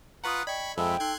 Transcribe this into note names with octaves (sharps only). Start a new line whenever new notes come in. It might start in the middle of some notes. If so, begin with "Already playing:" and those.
F4 B4 F#5 A#5 C#6 D#6 F#6
D5 D#5 G5 B5 C#6 G#6
F2 F3 G#3 A4 E5 G5 B5
D#4 A4 C6 F#6 G#6